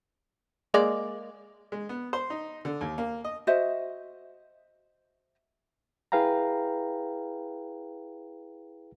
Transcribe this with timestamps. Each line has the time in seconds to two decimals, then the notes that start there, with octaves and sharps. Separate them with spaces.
0.74 G#3 A#3 D5
1.72 G#3
1.89 B3
2.13 C5
2.30 D#4
2.65 D3
2.81 D#2
2.98 A#3
3.24 D#5
3.47 F#4 C5 D#5 E5
6.12 E4 G#4 B4 F5 G5 A#5